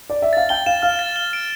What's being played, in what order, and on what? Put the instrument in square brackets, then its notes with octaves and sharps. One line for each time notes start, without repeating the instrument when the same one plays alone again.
[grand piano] D5
E5
[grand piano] F5 [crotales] A6
[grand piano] G5 [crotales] G7
[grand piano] F5 [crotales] E7
[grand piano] F5 [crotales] F6
[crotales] A6
G7
D7